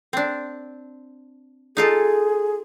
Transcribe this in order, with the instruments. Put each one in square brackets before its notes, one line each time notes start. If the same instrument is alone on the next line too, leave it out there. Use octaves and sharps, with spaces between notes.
[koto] C4 D4
[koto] D#4 F4 A4 [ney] G#4